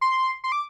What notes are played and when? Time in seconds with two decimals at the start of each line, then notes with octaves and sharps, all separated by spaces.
0.01 C6
0.44 C6
0.52 D6